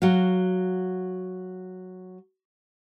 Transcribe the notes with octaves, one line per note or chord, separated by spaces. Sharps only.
F#3 F#4 F5